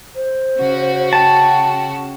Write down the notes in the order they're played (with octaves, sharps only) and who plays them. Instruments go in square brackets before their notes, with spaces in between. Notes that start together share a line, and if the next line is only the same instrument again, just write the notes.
[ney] C5
[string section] C#3 F#4
[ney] G5 [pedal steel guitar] A5